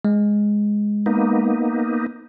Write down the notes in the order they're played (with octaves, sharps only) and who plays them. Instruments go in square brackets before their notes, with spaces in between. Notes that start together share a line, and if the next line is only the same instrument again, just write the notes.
[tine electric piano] G#3
[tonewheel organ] A#3 B3 D#4